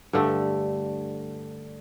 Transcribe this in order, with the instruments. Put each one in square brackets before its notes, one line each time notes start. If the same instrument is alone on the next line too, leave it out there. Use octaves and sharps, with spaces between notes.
[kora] G2 D3 A3